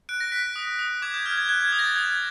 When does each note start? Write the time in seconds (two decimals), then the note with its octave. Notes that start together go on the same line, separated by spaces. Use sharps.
0.09 F#6 D7
0.20 A#6
0.32 F#6 B6
0.56 D#6
0.79 D#6
1.02 D6 G#6
1.14 G6
1.26 F6 G#6
1.38 G#6
1.49 F#6 G#6
1.61 G#6
1.72 D#6 G#6
1.79 A#6
1.84 A6
1.96 D#6 G#6